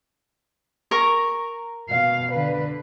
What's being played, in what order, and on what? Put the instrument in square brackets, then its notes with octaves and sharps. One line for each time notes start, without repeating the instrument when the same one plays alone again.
[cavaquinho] A#4 A#5 C#6
[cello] B2 F5
D3 B4